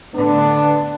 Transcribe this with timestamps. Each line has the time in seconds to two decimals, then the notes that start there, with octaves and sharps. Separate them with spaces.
0.15 A2 D3 B3 D4